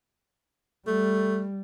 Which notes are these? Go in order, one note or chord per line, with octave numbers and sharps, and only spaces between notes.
G3 A3